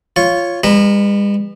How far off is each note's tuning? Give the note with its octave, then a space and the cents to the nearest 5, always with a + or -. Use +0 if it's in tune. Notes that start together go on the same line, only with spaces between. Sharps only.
F4 -5 C#5 +0
G#3 -45 B4 +0 A#5 +0